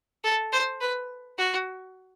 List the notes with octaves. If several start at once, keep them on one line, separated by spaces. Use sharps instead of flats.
A4
C5
B4
F#4